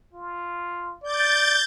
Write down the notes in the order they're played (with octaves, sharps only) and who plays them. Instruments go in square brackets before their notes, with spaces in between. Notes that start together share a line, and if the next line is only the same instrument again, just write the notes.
[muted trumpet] F4
[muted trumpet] D5 [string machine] G6 A6